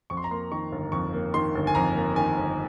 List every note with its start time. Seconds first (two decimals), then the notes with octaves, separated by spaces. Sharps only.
0.10 F2 C#6
0.17 C6
0.24 A#5
0.31 A#3 C6
0.51 D#3 C#6
0.72 G1
0.92 F2 C#6
1.13 A#3
1.34 D#3 C6
1.55 G1
1.67 G#5
1.75 F2 A#5
1.95 A#3
2.16 D#3 G#5
2.37 G1